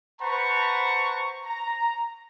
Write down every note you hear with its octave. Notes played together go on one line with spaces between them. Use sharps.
B4 C5 F#5 A5 A#5 C#6
A#5